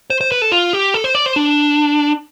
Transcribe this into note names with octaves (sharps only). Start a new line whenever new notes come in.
C5
C5
B4
A4
F4
G4
A4
C5
D5
C5
D4